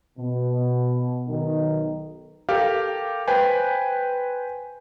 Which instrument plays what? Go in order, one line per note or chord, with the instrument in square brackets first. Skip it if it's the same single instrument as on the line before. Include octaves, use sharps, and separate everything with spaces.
[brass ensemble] B2
B1 D#3
[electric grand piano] G4 A4 A#4 F5
B4 C5 G5 G#5